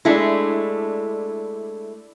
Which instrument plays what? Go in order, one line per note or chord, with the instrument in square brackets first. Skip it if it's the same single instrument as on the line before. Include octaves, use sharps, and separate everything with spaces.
[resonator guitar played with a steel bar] G#3 A3 [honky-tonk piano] D4 E4